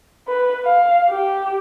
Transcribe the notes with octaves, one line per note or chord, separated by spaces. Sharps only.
B4
F5
G4